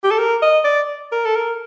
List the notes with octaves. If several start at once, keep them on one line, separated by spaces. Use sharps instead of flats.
G4
A4
A#4
D#5
D5
A#4
A4
A#4